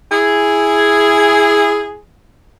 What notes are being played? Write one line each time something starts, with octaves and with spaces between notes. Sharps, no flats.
E4 G#4